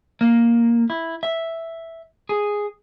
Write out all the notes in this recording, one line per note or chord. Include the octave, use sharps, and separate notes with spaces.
A#3
E4
E5
G#4